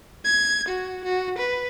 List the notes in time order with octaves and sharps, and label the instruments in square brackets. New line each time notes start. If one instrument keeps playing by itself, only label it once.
[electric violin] G#6
F#4
F#4
B4